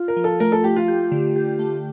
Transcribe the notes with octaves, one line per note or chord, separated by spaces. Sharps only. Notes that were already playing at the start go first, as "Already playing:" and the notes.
Already playing: F4
A#4
F3
A4
A3 A#4
A4
A3 G4
F4
G4
D3
G4
A3